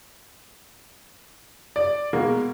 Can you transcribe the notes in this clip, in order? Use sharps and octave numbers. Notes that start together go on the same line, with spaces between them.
D5
B2 G#3 A#3